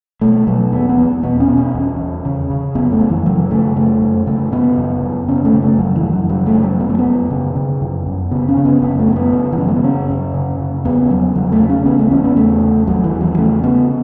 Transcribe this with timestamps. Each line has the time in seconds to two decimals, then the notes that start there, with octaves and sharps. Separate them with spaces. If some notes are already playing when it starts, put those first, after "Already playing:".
0.21 B2 A3
0.47 B2 F#3
0.72 E2 B3
0.89 B3
0.98 E2
1.23 B2 B3
1.40 C#4
1.48 B2
1.57 C#4
1.74 E2
1.99 E2
2.25 C#3
2.50 C#3
2.75 F#2 B3
2.92 A3
3.00 F#2
3.09 E3
3.26 C#3 F#3
3.51 C#3 A3
3.76 F#2 A3
4.01 F#2
4.27 C#3 A3
4.52 C#3 B3
4.78 F#2
5.02 F#2
5.28 C#3 C#4
5.45 A3
5.53 C#3
5.62 A3
5.79 F#2 F#3
5.96 E3
6.03 F#2
6.12 F#3
6.29 C#3 F#3
6.46 A3
6.55 C#3
6.63 F#3
6.80 F#2 B3
6.89 A3
6.98 B3
7.05 F#2
7.30 C#3
7.56 C#3
7.81 F#2
8.07 F#2
8.31 C#3 B3
8.49 C#4
8.57 C#3
8.65 B3
8.82 F#2 B3
8.99 A3
9.08 F#2
9.16 B3
9.33 C#3
9.52 E3
9.58 C#3 F#3
9.68 A3
9.76 B3
9.83 F#2 C#4
10.09 F#2
10.34 C#3
10.60 C#3
10.84 E2 B3
11.10 E2 F#3
11.35 C#3 F#3
11.52 A3
11.60 C#3
11.69 C#4
11.86 E2 B3
11.99 A3
12.11 E2 C#4
12.24 B3
12.36 C#3 A3
12.61 C#3
12.87 E2 F#3
13.04 E3
13.12 E2
13.21 F#3
13.37 C#3 A3
13.63 C#3 B3